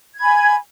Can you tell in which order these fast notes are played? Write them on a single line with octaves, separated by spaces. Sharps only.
G#6 B5 G#5